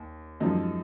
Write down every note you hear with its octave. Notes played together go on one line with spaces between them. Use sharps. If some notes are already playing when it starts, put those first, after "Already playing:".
Already playing: D#2
F#2 F3 G#3 D#4